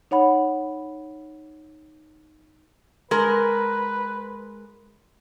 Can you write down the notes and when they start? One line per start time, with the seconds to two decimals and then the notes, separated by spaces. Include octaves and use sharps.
0.11 D#4 C#5 F#5 B5
3.11 G#3 A#4 B4